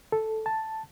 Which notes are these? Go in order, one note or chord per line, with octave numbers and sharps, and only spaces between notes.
A4
A5